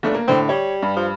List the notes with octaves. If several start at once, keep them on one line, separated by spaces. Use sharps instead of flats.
G1 A3 D4
A#3
A2 D3 C4
G3 C#5
G2
F3